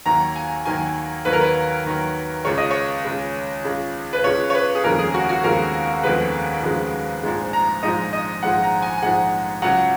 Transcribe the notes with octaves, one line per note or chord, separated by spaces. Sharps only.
D#2 D#3 F#3 A#5
G#5
D#2 D#3 F#3 G#5
D#2 D#3 F#3 B4
A#4
B4
D#2 D#3 F#3
C#2 C#3 G#3 C#5
D#5
C#5
C#2 C#3 G#3
C#2 C#3 G#3
B4
C#2 C#3 G#3 C#5
C#5
B4
G#4
F1 D#2 C#3 F3 G#3 A#4
G#4
F#4
F#4
F1 D#2 C#3 F3 G#3 A#4
F1 D#2 C#3 F3 G#3 B4
F1 D#2 C#3 F3 G#3
A#1 G#2 F3 G#3
A#5
A#1 G#2 F3 G#3 D#5
D#5
A#1 G#2 F3 G#3 F#5
A#5
G#5
G#5
A#1 G#2 F3 G#3 F#5
C#2 C#3 F#3 F#5